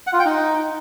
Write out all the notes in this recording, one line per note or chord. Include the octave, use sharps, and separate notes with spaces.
F#5
F4
G5
D#4